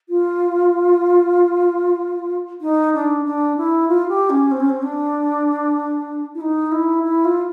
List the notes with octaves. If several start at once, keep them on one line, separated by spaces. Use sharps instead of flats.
F4
D#4
D4
D4
E4
F4
G4
C#4
C4
C#4
C4
D4
E4
D#4
E4
E4
F4